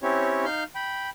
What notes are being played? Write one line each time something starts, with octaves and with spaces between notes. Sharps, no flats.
C4 C#4 E4 G4 C#5
D#4 F5 F6 G6
G5 B5